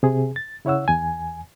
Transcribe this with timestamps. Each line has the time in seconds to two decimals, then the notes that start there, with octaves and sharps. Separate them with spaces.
0.03 C3 G#4
0.36 A6
0.65 C#3 E4 C#5 F#5 E6
0.88 E2 G#5